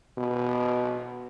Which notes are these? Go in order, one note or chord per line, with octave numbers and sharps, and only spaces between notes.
B2